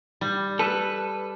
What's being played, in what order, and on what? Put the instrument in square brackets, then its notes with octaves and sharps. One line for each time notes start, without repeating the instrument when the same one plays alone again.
[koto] G3
[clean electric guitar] A4 [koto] B4